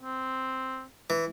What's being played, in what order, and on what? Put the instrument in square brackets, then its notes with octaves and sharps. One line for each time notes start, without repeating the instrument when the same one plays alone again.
[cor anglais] C4
[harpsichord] E3